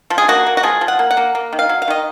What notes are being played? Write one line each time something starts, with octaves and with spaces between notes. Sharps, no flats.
F3
G#4
A#3 F#4
A#3
F#4
F3 G#4
F3
F#5
A#3
F#5
A#3
A#3
D#3
F5
F#3
F5
D#3 D#5